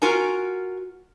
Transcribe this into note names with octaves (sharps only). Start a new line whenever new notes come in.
F4 F#4 A#4 G#5 A#5